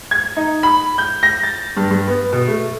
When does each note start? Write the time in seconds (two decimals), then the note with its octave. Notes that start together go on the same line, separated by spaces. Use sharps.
0.11 G#6
0.36 D#4
0.63 B5
0.98 G6
1.23 A#6
1.43 A6
1.77 G2
1.91 G2
2.08 B3
2.32 B2
2.48 A3